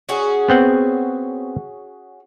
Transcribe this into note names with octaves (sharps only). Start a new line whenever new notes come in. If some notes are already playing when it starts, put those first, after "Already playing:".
C#4 F#4 G#4
B3 C4 F#5